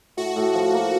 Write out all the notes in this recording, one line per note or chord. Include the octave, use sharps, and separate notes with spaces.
A2 F#4
A2
F3
A#3